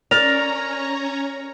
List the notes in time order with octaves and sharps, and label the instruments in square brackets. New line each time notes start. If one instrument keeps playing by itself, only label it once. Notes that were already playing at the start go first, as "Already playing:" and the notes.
[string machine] C#4 C#5 A#5 [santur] A#4 [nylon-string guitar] D5 [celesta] F7